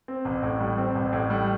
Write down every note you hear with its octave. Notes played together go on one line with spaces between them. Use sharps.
C4
A1
A2
G3
C4
A1
A2
G3